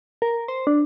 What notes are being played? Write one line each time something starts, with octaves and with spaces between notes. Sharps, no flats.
A#4
C5
D4